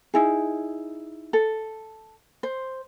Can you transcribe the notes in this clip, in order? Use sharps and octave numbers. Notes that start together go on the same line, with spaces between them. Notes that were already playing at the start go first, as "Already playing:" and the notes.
D#4 E4 G#4
A4
C5